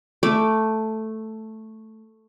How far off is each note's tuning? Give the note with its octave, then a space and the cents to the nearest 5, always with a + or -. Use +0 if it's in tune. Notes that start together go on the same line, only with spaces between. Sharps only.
A3 +0 D6 -5